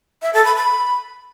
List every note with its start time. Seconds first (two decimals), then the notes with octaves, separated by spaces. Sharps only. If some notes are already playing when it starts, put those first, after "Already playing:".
0.22 E5
0.33 A4
0.45 B5
0.56 B5